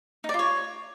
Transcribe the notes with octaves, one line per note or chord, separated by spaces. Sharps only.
D#4
D5
F4
C#5